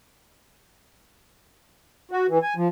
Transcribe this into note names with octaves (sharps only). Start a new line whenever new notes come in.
F#4
E3
G#5
F3